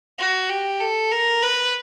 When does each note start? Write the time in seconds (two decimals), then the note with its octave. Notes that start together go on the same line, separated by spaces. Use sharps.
0.19 F#4
0.49 G4
0.80 A4
1.12 A#4
1.43 B4